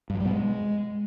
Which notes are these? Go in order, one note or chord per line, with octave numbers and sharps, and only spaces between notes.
G2
F#3
G3
B2
G#3